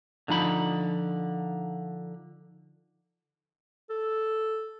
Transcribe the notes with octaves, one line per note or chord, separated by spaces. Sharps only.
D3 F3 D#4 B5
A4